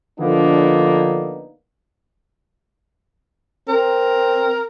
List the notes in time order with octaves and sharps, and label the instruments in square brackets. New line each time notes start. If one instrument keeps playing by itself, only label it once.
[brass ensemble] D3 F3 A#3 B3 D4 D#4
[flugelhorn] C4 [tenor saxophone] A#4